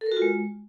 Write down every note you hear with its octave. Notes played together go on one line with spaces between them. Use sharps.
A4
A#4
F#4
F4
G#3